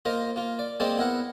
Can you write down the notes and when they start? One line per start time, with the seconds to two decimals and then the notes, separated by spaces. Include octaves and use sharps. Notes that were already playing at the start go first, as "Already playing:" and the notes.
0.05 A#3 F4 A#4 C5 D#5
0.36 A#3 F4
0.59 D5
0.80 G#3 A#3 C4 C5 D5 A5
0.98 B3 E4 A#4 F#5